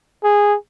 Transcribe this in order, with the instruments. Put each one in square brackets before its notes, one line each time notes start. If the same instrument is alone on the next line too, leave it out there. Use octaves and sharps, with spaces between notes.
[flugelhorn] G#4